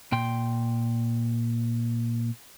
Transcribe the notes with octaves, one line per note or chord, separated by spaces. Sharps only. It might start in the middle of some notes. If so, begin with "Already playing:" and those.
A#2 G5 C6